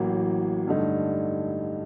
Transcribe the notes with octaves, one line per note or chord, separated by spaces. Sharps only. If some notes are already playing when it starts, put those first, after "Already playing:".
Already playing: A1 A2 F#3 A#3
G2 D3 A3 D#4